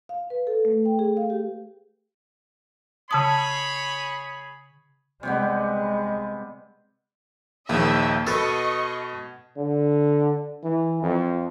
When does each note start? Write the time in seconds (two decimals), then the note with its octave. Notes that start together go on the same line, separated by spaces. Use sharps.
0.09 F5
0.30 B4
0.47 A4
0.65 A3
0.85 G5
0.99 G#4
1.17 F5
1.30 G4
3.11 C#3 G#4 C#5 A5 B5 D#6
5.23 C3 G3 G#3 B3
7.69 A#1 D#2 D#3 D#5 E5
8.27 B2 A4 B4 D#5 C#6
9.57 D3
10.64 E3
11.02 F2